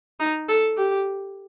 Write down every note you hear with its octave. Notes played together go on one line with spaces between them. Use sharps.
D#4
A4
G4